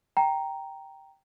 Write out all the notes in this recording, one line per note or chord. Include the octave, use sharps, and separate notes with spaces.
G5 A#5